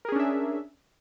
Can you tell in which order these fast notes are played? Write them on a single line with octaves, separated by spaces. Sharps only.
A#4 G#4 C#4 D4 E5